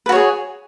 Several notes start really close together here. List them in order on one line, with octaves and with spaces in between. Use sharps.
B4 F#4 C#5 G#4